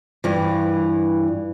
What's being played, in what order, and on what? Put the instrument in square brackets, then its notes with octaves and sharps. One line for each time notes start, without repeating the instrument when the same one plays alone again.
[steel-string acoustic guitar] G2 E3